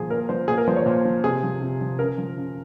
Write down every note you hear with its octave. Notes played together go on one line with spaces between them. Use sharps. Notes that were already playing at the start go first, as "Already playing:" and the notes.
Already playing: A#2 F3 G#4
A#2 A#4
F3 C5
A#2 G#4
A#4
F3 C5
C#5
A#2 C5
F3
C3 G#4
F3
C3
F3
C#3 A#4
F3
C#3